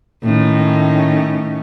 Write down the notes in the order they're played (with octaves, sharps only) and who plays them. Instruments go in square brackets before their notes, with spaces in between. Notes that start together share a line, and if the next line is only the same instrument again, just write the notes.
[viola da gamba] A2 D#3 C#4